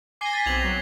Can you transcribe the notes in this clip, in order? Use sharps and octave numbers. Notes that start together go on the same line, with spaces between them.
G#5 D6 A#6 C7 G7
A6 B6
B1 C4 G#6 F7 F#7
F#3